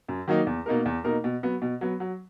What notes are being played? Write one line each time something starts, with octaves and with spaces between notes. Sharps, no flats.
F#2
D#3 F#3 A#3 D#4
E2
B2 A#3 D#4 A#4
E2
B2 A#3 D#4 A#4
B2
F#3 B3
B2
F#3 B3
F#3